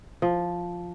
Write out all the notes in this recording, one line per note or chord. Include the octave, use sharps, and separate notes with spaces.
F3